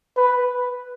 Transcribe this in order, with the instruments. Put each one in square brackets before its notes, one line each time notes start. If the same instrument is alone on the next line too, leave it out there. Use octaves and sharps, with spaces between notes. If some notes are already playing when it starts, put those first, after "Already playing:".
[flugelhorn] B4